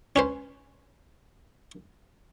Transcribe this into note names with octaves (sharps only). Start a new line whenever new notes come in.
C#4 B4 C5